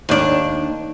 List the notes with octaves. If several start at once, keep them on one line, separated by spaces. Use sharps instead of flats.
D#2 D4